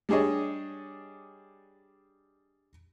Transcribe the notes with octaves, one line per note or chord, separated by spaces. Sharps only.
G3 D4 G#4 C#5 D#5